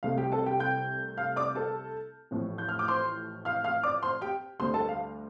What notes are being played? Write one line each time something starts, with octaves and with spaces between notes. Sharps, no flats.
C2 C3 A3 F5
G4 G5
A4 A5
G4 G5
G5 G6
F5 F6
D5 D6
A4 A5
A1 A2 F3
G6
F6
D6
C5 C6
F5 F6
F5 F6
D5 D6
C5 C6
G4 G5
D2 D3 G3 C5 C6
A4 A5
F5